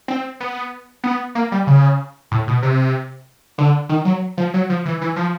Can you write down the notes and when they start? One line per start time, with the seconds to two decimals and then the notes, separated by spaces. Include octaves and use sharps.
0.08 C4
0.40 B3
1.04 B3
1.35 A#3
1.52 G3
1.67 C#3
2.31 A2
2.47 B2
2.62 C3
3.58 D3
3.89 D#3
4.05 F#3
4.37 F3
4.54 F#3
4.70 F3
4.85 E3
5.01 E3
5.16 F3